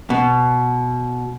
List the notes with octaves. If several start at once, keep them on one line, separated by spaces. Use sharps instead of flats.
B2